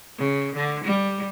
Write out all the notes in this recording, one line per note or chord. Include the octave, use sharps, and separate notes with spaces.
C#3
D3
G3